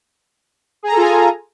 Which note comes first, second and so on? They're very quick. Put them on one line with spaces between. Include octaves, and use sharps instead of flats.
G#4 A#5 A4 F4 G#5